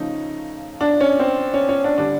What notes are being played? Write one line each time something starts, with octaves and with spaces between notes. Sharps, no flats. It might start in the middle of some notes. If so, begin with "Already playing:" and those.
Already playing: C#3 F3 A3 D#4
D4
C#4
C4
C#4
C#4
D4
D3 G3 D4